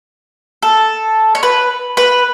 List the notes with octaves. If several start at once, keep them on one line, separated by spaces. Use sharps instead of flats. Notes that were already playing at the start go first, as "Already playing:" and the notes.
A4
C#5
B4
B4